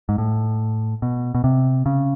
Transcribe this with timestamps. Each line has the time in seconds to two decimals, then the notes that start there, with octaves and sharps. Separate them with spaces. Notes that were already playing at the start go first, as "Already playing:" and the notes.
0.09 G#2
0.18 A2
1.02 B2
1.35 B2
1.44 C3
1.86 C#3